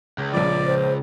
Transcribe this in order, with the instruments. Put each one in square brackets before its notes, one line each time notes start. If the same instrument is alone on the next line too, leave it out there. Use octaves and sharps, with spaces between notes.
[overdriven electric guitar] C#2
[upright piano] A#1 F3 [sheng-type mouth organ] D5
[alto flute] C5